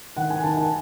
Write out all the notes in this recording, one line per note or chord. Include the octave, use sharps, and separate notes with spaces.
D#3 F#5
G#5
D#3 A5
G#5